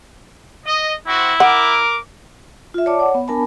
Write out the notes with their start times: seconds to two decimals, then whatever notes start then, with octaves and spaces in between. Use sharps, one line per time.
0.65 D#5
1.06 C4 E4 F#4
1.40 A#4 F#5 D6
2.74 F4 E5
2.86 C#5 D5 A5 D6
3.00 C#5 F#5
3.14 B3
3.28 B3 D4 A#4 G#5 A5 B5